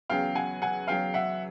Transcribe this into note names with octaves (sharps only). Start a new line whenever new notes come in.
E2 C#3 F#3 F5 G5
F#5 G#5
F#5 G#5
E2 C#3 F#3 F5 G5
E5 F#5